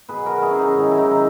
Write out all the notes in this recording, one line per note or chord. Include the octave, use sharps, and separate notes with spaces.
B2 F#3 G#4 B4
F#4 A#4
E4 G#4
C#4
D#4
G#2 D#3 F#3 D#4
E4
D#4
E4